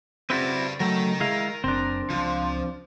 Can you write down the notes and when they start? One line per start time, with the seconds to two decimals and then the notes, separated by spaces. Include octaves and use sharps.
0.30 C#3 C4 E4 F#4 B4 D5
0.80 F#3 A3 A#4 G5
1.20 G#3 E4 F5
1.64 F#1 C4 D4
2.10 C#2 F3